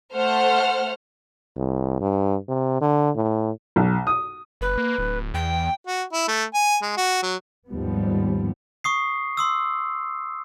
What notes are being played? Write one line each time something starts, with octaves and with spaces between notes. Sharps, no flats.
A3 C5 F#5 F6
C2
G2
C3
D3
A2
B1
D#6
F#1 B4
A#3
D1
E2 G5
F#4
E4
A3
G#5
G#3
F#4
F#3
D#2 G#2 F3 G3 B3
C#6 D#6 C7
C6 D#6 E6